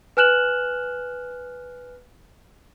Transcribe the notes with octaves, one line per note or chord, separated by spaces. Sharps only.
B4 G#5 F6 F#6 E7 F#7